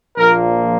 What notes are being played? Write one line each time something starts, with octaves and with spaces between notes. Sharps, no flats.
A#1 A#2 F3 A#3 A#4